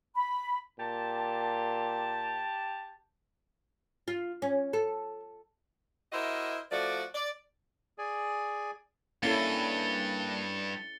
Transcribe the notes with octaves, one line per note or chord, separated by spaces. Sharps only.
B5
A#2 G4 A5
F4
C#4
A4
E4 F#4 A#4 C5 D#5 E5
F3 A3 F#4 D5
D5
G#4 D5 G#5
G2 A#3 C#4 E4 A4 A6 C#7 G7